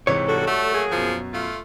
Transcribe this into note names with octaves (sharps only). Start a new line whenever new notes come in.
G#2 C3 E3 C#5
A2 G3 F#4 A4
A3 F#4
F#3 A#3 G#4
F#2 B2 F3
A3 F4